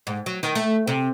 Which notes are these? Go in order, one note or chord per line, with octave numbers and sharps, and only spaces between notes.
G#2
F#3
D#3
A3
C3